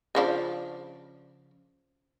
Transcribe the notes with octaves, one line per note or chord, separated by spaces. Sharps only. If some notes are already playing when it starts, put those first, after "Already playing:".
C#3 F3 D4